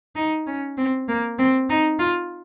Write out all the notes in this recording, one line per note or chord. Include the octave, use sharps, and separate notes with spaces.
D#4
C#4
C4
A#3
C4
D#4
F4